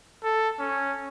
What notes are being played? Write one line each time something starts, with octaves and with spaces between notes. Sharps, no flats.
A4
C#4